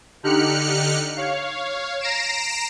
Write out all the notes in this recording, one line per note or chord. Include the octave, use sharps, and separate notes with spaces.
D3 D#4 G4 F6 F#6 C#7
C#5 F5
A#5 A#6 C7 D7 E7